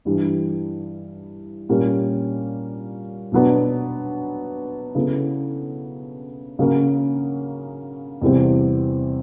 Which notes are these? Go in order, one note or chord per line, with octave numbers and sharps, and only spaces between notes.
G2 E3 G3
A#2 G3 A#3 C#4
B2 F#3 B3 D4
C#3 F#3 B3 E4 A4
C#3 F#3 A#3 C#4
E2 C3 E3 G3 C4